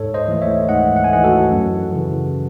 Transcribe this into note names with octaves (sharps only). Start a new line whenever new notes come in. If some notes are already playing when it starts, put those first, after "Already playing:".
Already playing: G#2 A4 C#5
C5 D#5
E3 A3
C#5 E5
G#2 D#5 F#5
F#5
G#5
E3 A3 D#5 F#5
F#4 A4
F#2
C#3 E3